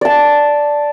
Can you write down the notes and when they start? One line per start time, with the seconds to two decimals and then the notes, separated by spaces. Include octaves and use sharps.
0.01 D5 A5